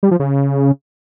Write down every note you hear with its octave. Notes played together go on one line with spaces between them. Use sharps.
G3
F3
C#3